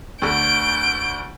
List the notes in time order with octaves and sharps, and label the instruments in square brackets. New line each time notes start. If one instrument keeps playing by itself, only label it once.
[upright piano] D2 D3 [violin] G6 D7